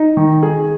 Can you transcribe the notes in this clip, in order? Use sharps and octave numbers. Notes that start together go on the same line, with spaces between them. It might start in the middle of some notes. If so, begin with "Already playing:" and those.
Already playing: D#4
D#3
G#4